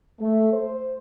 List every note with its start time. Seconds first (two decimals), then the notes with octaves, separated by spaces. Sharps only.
0.19 A3
0.53 C5